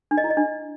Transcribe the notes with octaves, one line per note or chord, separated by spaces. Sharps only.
D4
D#5
E4
D#5
D4